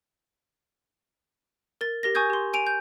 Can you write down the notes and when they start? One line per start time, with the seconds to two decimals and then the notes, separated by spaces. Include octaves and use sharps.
1.81 A#4 A6
2.03 G4 A#4 A#6
2.15 G#5 C#6 D#6 G6 G#6
2.30 G4 C6
2.53 G#5 D7 D#7 F7
2.67 G6